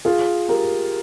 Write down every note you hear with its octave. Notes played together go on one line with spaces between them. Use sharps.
F4 G#4
G4 A#4